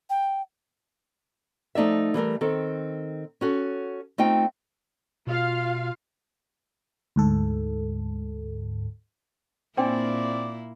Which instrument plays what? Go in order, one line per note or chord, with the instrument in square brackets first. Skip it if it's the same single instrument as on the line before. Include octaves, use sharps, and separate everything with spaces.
[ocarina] G5
[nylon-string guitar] F3 A3 D#4 D5 E5
E3 G3 A3 A#4
D#3 C4 A4
C#4 F#4 A4
A3 C4 D#4 F4 G5
[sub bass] B2 [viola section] F4 F5
[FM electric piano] D2 G#2 A4
[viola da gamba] A#2 A#3 E4 [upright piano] C4 [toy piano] D4 G5 G#5 [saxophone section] D5